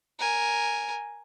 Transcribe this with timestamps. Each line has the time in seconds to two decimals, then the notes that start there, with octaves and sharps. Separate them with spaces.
0.19 A#4 G#5